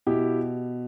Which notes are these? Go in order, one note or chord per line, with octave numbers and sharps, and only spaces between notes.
B2 E4 G4